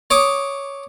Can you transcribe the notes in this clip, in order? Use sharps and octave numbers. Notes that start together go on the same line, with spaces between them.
C#5 D6 D#6